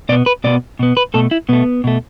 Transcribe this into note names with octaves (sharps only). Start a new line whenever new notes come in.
B2 B3 D5
B4
B2 B3 D5
B2 B3
B4
B2 A3 A4
E4
B2 A3 B3
B2 A3